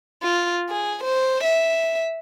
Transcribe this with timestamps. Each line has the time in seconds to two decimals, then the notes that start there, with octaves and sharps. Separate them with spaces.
0.22 F4
0.69 G#4
1.04 C5
1.44 E5